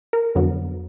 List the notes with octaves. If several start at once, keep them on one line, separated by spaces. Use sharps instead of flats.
A#4
F2 D3 F#3 B3